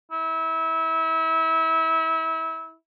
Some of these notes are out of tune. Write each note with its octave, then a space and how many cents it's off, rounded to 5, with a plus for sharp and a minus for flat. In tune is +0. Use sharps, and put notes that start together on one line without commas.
E4 -30